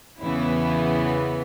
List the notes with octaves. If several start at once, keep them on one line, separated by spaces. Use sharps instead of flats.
E2 C#3 E3 B3 E4